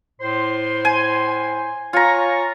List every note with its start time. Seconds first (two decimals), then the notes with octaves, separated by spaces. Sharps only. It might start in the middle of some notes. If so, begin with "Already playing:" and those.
0.20 A2 C5 C6
0.85 G#5
1.93 F4 C#5 G#5 A#5 C#6